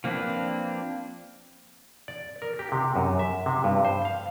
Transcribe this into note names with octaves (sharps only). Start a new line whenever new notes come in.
F3 A#3 C4 D4 B4
D5
A#4
G4
C3
F#2
E5
C3
G2
C5
F5